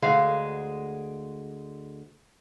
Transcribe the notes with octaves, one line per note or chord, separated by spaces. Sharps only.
D2 G#3 F5